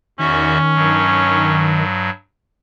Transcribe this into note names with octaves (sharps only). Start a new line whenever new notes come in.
E2 D#3 C#4 F#4 E5
G2 F#3